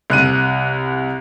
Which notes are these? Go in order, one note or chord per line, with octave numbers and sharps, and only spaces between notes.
C2 F#6 D#7